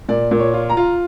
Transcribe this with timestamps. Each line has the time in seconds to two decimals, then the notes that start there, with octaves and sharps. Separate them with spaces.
0.09 A#2 D5
0.31 A#2
0.39 C#5
0.54 F4
0.69 A#5
0.77 F4